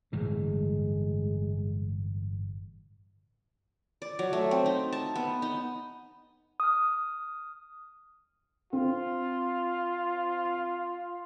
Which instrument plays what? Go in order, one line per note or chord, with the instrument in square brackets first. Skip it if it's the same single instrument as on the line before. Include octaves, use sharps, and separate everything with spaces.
[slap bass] G1 A2 E3 [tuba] G#3
[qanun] D5
F#3
A3
C4
D#4
A5
B3
D#4
[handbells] D#6 F6
[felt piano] C4 [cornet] F4